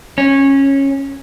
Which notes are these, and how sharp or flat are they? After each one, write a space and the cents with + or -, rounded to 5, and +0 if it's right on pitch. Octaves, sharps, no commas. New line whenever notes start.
C#4 -15